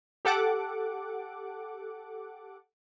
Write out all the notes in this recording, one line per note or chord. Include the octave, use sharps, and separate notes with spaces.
G4 A4 F#5 D6